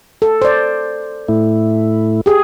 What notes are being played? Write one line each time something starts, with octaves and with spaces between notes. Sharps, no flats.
A4
C5 D5
A2 A3 E4
G4 G#4